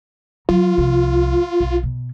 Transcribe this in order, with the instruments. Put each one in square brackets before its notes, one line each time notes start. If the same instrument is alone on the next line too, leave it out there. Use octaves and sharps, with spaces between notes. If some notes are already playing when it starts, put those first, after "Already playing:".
[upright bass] F#3 [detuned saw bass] F4
[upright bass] C2 F3
B1
B2